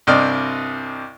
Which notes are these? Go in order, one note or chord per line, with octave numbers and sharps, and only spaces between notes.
C2 G2 C3 D5 D#5 F6